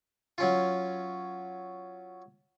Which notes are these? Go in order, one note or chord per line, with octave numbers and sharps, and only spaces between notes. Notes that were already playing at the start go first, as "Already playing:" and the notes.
F#3 C#4 F4